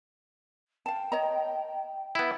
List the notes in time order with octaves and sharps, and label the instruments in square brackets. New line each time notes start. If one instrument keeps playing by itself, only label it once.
[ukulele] F5 A5 [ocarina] G5
[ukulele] C#5 D#5 A#5
[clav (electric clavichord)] B3 E4